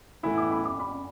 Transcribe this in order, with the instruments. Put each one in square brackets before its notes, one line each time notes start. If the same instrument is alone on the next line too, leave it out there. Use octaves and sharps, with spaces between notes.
[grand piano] A2 E3 B3 E4 [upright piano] B5
[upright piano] D6
B5
D6
B5